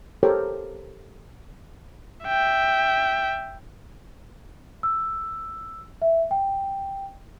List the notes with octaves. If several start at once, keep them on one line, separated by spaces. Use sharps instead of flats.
G4 A4 A#4 C5 C#5 G5
E5 G5
E6
E5
G5